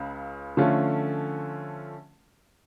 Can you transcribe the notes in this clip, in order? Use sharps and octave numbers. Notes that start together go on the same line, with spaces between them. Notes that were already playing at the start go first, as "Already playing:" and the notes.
Already playing: C#2 C#3
D3 F3 A3 C#4 F4